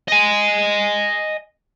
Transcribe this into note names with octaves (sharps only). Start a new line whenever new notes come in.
D#5 G#5